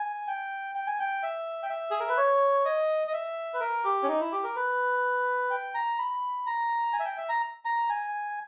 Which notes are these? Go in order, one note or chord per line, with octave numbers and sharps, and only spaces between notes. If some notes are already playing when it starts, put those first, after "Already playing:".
Already playing: G#5
G5
G5
G#5
G5
E5
G5
E5
G#4
A#4
B4
C#5
D#5
D#5
E5
B4
A#4
G4
C#4
D#4
E4
G4
A#4
B4
G5
A#5
B5
A#5
G#5
E5
G5
E5
A#5
A#5
G#5